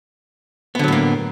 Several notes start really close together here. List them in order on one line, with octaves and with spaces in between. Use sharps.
B3 D3 F#3 A2 A#3